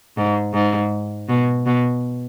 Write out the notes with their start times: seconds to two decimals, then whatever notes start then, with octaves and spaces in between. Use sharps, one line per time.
0.17 G#2
0.54 G#2
1.29 B2
1.66 B2